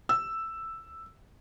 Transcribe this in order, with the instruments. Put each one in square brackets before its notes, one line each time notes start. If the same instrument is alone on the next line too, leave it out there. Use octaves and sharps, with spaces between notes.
[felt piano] E6